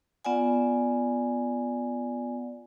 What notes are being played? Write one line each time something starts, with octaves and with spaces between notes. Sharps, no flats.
B3 F4 D5 F#5 G#5